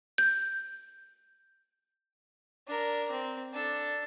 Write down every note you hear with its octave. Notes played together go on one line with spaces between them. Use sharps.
G6
D4 A#4
C4
D4 A4